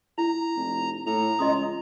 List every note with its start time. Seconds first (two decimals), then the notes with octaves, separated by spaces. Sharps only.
0.18 E4 A#5
0.56 F1
1.06 A2 A#5
1.39 C#2 D#5 C6 D#6